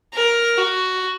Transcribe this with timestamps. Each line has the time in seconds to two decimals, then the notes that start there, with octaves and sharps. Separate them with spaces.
0.13 A#4
0.58 F#4